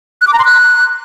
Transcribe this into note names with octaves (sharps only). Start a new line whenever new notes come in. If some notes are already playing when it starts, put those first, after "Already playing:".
F#6
D6
A#5
C6
F#6